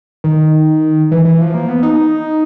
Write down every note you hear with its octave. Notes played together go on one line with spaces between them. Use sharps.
D#3
E3
E3
F3
A#3
B3
D#4